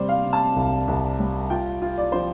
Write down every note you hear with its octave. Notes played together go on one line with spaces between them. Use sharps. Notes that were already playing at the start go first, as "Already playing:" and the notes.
Already playing: C3 G3 C5 D5
F5
C3
A5
C2
C2
G3
F4 G5
F4
D5
F3 C5